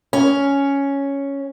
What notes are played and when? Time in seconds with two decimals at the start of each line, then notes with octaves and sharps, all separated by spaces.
0.13 C#4